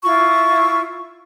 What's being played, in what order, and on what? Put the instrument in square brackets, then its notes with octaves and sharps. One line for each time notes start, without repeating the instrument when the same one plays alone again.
[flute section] E4 F4 C#6